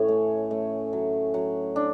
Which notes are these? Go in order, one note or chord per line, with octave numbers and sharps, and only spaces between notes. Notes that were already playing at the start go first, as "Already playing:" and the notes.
Already playing: A2 E3 C#4
A3
A3
F#3
F#3
D4